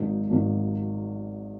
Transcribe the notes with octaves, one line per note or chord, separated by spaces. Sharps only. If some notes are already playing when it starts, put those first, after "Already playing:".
Already playing: G#1 G#2 F#3 A#3 D#4
G#1 G#2 F#3 A#3 D#4